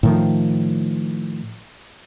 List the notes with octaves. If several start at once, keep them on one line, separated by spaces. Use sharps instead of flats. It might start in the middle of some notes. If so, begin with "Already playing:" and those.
A2 D#3 F3